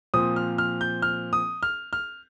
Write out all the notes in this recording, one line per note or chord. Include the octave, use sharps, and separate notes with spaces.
A#2 F3 C4 D#6
F6
F6
G6
F6
D#6
F6
F6